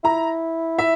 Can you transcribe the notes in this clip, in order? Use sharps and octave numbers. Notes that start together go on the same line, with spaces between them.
E4 A#5
E5